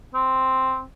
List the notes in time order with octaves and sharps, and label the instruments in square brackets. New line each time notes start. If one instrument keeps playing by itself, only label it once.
[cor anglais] C4